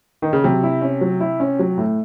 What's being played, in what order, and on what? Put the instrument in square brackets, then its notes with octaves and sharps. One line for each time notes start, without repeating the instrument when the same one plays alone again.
[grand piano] D#3
C#3
[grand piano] C3 [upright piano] F#3
[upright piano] E4
C#4
F#3
E4
C#4
F#3
A2